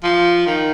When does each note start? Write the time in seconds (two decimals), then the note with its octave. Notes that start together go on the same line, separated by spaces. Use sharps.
0.03 F3
0.47 D#3